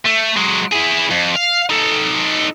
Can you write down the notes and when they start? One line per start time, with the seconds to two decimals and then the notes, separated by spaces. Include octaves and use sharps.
0.05 A3
0.37 F#3 G#3
0.73 E4 G#4
1.12 F2
1.36 F5
1.69 D#4 A4